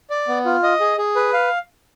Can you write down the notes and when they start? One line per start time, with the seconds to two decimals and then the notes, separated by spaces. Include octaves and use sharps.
0.10 D5
0.28 B3
0.45 F4
0.63 D#5
0.80 G#4
0.98 G#4
1.16 B4
1.33 F5